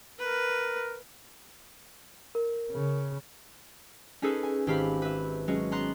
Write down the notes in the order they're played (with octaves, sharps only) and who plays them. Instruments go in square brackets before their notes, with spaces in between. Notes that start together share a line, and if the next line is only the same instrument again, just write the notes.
[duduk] A#4 [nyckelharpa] B4
[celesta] A#4
[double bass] C#3
[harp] C#4 D#4 G#4 A4 B4
G#5
G#1 G4 F5 B5 F6
B4 E5
F#3 G#3 C#4
B3 A#5 C6 F#6